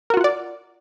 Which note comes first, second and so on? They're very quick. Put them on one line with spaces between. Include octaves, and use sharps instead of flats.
A#4 F#4 F4 F#5 D5